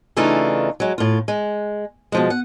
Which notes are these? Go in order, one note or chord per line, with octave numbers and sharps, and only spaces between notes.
C#3 E3 A3 D4 D#4 F4
F#3 G#3
A2 F4
G#3
B2 F3 G#3
F#5